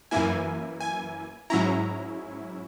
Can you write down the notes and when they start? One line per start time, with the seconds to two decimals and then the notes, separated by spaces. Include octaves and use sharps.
0.11 F#2 E3 A#3 E4 G#5
0.80 G#5
1.50 G#2 F#3 C#4 E4 A#5